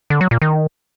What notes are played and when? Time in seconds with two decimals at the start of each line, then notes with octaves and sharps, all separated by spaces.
0.10 D3
0.21 F#3
0.31 A#2
0.42 D#3